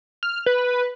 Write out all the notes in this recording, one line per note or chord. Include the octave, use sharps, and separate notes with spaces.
F6
B4